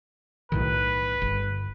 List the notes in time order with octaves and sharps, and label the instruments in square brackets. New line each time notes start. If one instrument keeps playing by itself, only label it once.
[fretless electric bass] B1 A2 D#3 [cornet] B4
[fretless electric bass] G1